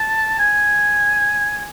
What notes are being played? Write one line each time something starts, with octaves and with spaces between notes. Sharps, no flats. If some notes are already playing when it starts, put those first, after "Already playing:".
Already playing: A5
G#5